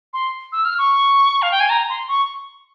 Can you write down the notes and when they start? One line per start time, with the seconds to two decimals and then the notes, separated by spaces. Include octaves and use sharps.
0.13 C6
0.52 E6
0.65 F6
0.78 C#6
1.42 F5
1.51 G5
1.60 G#5
1.69 A#5
1.89 C6
2.08 C#6